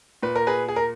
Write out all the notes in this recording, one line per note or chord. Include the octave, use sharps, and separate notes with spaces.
A#2 B4
A#4
G#4 B4
G#4
A#4